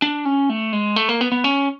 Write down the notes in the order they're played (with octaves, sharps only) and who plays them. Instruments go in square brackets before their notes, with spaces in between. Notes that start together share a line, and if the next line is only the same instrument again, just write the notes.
[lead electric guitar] D4
C#4
A3
G#3
A3
A#3
B3
B3
C#4